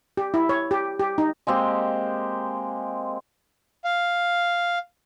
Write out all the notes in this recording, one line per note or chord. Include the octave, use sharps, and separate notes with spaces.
G4
E4
C#5
G4
G4
D#4
G#3 A#3 C4 G4
F5